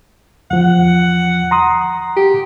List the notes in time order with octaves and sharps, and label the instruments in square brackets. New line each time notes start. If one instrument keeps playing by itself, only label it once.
[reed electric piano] E2 F3 [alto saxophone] F#5
[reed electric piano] A#5 C6 D#6
[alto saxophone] G4